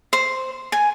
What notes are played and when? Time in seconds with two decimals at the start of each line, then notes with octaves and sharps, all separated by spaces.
0.13 C5
0.72 G#5